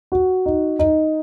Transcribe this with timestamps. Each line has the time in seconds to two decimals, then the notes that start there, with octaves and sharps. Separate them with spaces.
0.12 F#4
0.46 D#4
0.79 D#4